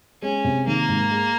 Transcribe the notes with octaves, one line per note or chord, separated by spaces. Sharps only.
G#3 C#4
C3
D#3 A#3
G#2
G#3